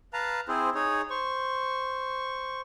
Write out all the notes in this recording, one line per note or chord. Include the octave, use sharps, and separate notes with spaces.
B4 F5 A5 A#5
C4 E4 G#4 C5
D#4 G#4 C#5
C5 C#6